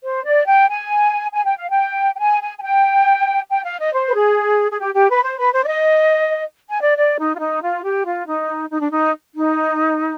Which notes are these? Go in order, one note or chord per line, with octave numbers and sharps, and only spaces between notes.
C5
D5
G5
G#5
G#5
G5
F5
G5
G5
G#5
G#5
G#5
G5
G5
F5
D#5
C5
B4
G#4
G#4
G4
G4
B4
C5
B4
C5
D5
D#5
G#5
D5
D5
D#4
F4
D#4
F4
G4
F4
D#4
D#4
D4
D#4
D#4